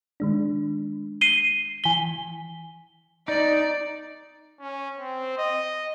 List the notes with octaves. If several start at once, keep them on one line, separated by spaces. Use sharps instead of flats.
D#3 G#3 D4
C7 D#7 G7
E3 G#5 B6 G7
D#4 D5
C#4
C4
D#5